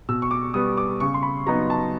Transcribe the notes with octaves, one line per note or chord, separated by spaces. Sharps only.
B2 E6
C#6
D6
G3 B3 D#6
D6
C#3 C#6
C6
B5
F#3 B3 D#4 A#5
A5